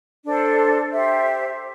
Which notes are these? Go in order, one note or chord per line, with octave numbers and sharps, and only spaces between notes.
D4 A4 C5
G4 C5 E5